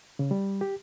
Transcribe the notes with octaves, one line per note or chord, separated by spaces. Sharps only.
C#3
G3
G4